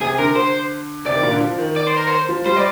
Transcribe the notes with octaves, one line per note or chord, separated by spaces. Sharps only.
C3 G#4
D3 A#4
C5
C3 D5
D#3
A#2
D3
F3
D#3
D5
C5
A#4
C5
F3
G3 C5
D5